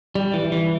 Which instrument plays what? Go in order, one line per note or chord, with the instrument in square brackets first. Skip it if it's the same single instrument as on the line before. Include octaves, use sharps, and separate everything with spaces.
[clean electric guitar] G3
E3
E3